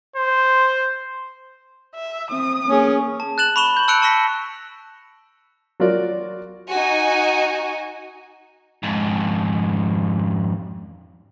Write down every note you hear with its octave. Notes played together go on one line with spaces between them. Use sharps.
C5
E5
C4 D#6
A#3 C#4 G#4
A5
F#6 A6 E7 F#7
B5 C#6 E7 G7
G6 F#7
A5 E6 F#6 C#7 D7 F7
A5 C#6 E6 A#6 B6 C#7
F#3 F4 F#4 A#4 D5
D#4 F#4 G#5
F2 G#2